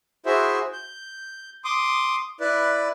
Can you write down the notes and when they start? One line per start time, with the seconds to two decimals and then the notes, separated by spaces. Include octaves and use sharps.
0.26 E4 F#4 G#4 C5 E5
0.73 G6
1.64 C6 D6 D#6
2.40 E4 B4 D5